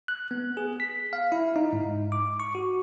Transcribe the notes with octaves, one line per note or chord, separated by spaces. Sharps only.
F#6
B3
G#4
B6
F5
E4
D#4
G#2
D6
C#6
F#4